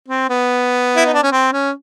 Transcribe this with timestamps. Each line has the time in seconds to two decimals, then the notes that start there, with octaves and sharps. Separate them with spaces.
0.08 C4
0.29 B3
0.96 E4
1.06 D#4
1.14 D4
1.23 C#4
1.32 C4
1.52 C#4